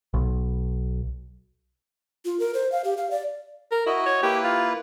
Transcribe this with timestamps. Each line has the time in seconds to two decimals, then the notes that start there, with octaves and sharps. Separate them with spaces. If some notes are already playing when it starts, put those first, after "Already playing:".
0.14 B1
2.25 F4
2.40 A#4
2.54 C5
2.72 F5
2.84 G4
2.97 F5
3.11 D5
3.71 A#4
3.87 E4 F#4 D#5
4.06 C#5
4.23 A#3 E4 G4 B4
4.44 F4